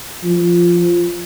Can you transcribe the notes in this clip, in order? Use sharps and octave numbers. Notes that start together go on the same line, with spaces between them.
F3